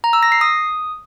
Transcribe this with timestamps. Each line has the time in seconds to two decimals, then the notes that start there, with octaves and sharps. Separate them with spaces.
0.04 A#5
0.13 E6
0.23 A#6
0.32 C7
0.41 D#6